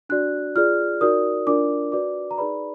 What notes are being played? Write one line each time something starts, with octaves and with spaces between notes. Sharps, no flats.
D4 F#4 D5 F#6
F4 G#4 D5 F6
D#4 F#4 A#4 D5 D#6
D4 F4 A#4 D5 D6
F#4 B4 D5 D6
A#5
D#4 G#4 B4 D5 B5